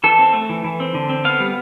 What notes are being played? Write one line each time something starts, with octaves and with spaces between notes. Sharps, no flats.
E3 A4
C4
A3
E3
E3
C4
D3
C4
B3 F5
G3